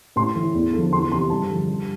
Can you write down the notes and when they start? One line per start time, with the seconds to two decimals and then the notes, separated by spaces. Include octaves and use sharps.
0.16 A2 C6
0.36 E3
0.54 E2
0.73 D3 F3
0.92 E2 C6
1.11 C3 E3 C6
1.30 G2 A5
1.49 D3 F3
1.68 G2